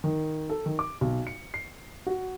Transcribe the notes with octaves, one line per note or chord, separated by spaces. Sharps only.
D#3
A4
D#3
D6
B1
C#7
C7
F#4